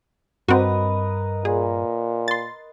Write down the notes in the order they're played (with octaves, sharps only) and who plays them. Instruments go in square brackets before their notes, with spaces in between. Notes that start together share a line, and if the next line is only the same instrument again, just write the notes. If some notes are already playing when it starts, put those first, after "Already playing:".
[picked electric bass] G2 [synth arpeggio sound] C4 F#4 [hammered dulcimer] A#4 B4 D#5
[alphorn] A#2 [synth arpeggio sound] G#4
[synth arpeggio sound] C6 A6